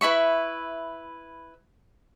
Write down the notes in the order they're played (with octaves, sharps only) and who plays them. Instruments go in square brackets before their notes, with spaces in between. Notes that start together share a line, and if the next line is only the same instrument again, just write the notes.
[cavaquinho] E4 B4 E5 C#6